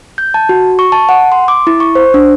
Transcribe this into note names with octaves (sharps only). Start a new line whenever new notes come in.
G6
A5
F#4
C#6
A5
F#5
C6
D6
E4
C#6
C5
D4